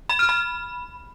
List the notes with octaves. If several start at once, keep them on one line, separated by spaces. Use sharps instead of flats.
B5
F6
B5